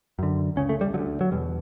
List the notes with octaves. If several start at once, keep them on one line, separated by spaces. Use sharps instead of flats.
F#2 D3
C#2 C#3 C#4
A3
G3
D2 D3 F#3
F#3
E2 B2 G3